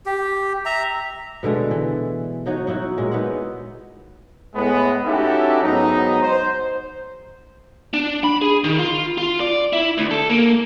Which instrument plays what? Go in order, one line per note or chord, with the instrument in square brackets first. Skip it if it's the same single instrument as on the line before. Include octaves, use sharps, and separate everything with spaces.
[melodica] G4
E5 A#5
[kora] B2 D3 G#3 A3
E3
F#3 D#4 F#4 C#5
F#3 D#4 E4 F#4
A#2 G#3
B3 D#4 E4 F#5
[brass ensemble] A2 G#3 B3
C#4 D#4 E4 F#4 G4 A4
G#2 F#3 B3 D#4
C5
[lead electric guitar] D4
B5
G#4
D#3
F4
F4
D5
E4
D2
A4
A#3